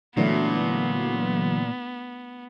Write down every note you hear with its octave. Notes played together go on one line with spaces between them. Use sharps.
A#2 D3 E3 F#3 A3 B3 D4 E4